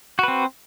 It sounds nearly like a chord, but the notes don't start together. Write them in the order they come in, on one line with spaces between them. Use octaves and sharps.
F#4 B4 C4